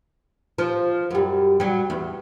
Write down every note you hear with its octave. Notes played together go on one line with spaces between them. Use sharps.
F3
F#2 G3
F#3 G3
E2